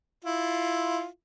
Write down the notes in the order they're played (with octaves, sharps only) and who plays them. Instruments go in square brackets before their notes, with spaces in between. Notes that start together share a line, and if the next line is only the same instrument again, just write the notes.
[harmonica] E4 F4